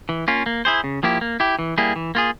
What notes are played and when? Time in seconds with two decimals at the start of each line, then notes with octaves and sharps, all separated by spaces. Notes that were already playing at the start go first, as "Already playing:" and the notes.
0.09 E3
0.28 A#3 C#4 F4
0.46 A#3
0.65 E4 G#4 C5
0.84 C#3
1.03 F3 A#3 E4 G4
1.21 A#3
1.40 E4 G4
1.59 E3
1.78 G3 A#3 E4 G#4
1.96 E3
2.15 A#3 F4 G#4